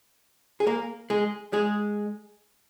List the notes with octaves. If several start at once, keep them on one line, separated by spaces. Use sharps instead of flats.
G#4
A#3 A#4
G#3 G#4
G#3 G#4